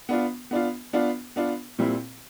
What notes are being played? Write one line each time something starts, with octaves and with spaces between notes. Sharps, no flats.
B3 D4 F4
B3 D4 F4
B3 D4 F4
B3 D4 F4
A#2 G3 C4 E4